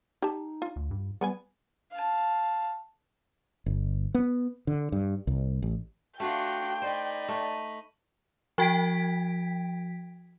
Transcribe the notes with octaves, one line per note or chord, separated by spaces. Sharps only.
D#4 G4 A5
F4
D2
G2
G3 B3 B4 G#5
F5 A5
G1
B3
D3
G2
C2
A1
A3 D4 F4 F#4 G5
D#4 C5 D5 B5
A3
F3 F#4 G5 G#6 B6 D7